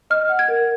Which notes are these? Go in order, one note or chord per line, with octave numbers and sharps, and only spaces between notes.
D#5 F6
F#5
G#6
A#4